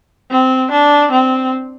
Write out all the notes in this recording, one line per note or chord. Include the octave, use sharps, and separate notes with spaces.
C4
D4
C4